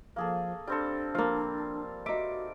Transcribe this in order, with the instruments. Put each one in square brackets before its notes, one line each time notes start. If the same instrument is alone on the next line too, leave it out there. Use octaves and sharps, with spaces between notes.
[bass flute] F3 [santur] A#3 G#4 A4
[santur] G3 C4 A4 [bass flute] D4
[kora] F3 A#3 [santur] F5
[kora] D#4 E5 [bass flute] F#4 [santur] D6